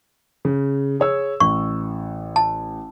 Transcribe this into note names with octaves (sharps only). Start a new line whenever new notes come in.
C#3
G#4 C#5 E6
A1 C#6
A5